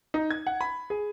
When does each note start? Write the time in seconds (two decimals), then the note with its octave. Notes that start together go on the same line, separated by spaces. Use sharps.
0.14 D#4
0.31 G#6
0.47 F#5
0.61 B5
0.90 G#4